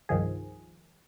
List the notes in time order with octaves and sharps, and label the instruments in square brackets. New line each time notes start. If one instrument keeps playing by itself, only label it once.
[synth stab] C2 G2 D#3 F3 G#4